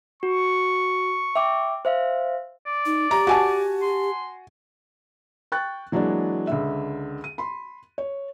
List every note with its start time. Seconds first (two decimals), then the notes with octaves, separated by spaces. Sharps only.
0.23 F#4 C#6
1.35 E5 G5 D6
1.85 C5 E5 F5
2.66 D5
2.86 D#4
3.11 G4 A#5
3.27 F#4 G#5 A5
3.82 C6
5.52 G5 C#6 F#6 A6
5.92 E3 F#3 G#3 A#3 D4
6.47 C#2 D3 E5
7.24 D#7
7.38 B5 C6
7.98 C#5